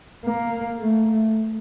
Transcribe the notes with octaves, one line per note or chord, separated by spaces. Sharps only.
A#3
A3